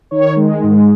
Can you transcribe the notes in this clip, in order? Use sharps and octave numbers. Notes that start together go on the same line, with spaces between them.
D#3 C#5
G#3
G#2